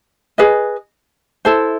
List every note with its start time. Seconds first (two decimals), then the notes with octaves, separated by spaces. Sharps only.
0.38 G#4 B4 D#5
1.45 E4 A4 C5